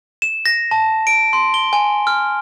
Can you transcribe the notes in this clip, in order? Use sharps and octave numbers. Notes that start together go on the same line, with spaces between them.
E7
A#6
A5
D7
C6
G7
G#5
F6